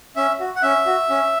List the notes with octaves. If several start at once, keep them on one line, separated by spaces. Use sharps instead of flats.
C#4 E5
F#4
F#5
C#4 E5
F#4
C#4